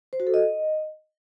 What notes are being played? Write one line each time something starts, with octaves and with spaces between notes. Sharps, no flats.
C5
F#4
A4
D#5